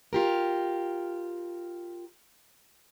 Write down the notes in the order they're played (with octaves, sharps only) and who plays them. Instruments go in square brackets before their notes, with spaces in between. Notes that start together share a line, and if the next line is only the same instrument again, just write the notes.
[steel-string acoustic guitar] F4 G4 A#4